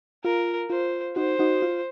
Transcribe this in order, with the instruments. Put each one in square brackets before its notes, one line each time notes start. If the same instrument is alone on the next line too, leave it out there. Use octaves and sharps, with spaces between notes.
[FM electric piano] F4 [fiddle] A#4
[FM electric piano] F4 [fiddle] C5
[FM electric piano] D#4 F#4 [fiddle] C5
[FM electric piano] D#4 F#4
F4